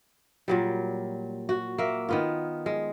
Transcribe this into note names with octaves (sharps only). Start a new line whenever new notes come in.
A#2 F#3 G3
F#4
A#3 E5
D#3 B3 F4
G#3